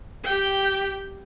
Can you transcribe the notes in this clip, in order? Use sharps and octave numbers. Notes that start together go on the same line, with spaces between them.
G4 G5